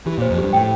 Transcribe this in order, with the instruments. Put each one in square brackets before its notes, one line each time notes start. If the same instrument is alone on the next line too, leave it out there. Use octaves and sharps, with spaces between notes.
[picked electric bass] E3 [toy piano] G4
[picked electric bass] A#2
[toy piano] C5
[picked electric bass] F2
[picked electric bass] G2 [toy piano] G4
[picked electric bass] A2 [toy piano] G5